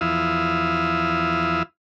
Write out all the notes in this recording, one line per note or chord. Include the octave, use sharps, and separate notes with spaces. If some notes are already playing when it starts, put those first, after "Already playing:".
E2 F3 E4 F5 D#6 E6